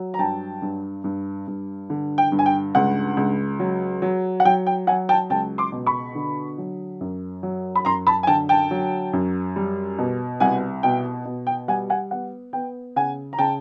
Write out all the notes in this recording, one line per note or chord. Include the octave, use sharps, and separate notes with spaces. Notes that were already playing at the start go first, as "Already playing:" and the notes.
Already playing: F#3
A#5
G2 G5 A5
G2
G2
G2
D3
G5
G2
G#5
G5
C#2 F#5
C#2
F#3
F#3
F#5
F#3 G5
G5
F#3 F#5 G#5
G5 A5
C#2 G5 A5
C6 D6
B2
B5 C#6
D3
F#3
F#2
F#3
B5
F#2 A#5 C6
A5 B5
G#5
D3 G5 A5
G5 A5
F#3
F#2
G3
B2
C2 F#5 G#5
B2 G5
B2
G5
G3 F#5 G#5
F#5 G#5
B3 F#5
B3 G5
C#3 F#5 G#5
A#5
C#3 G5 A5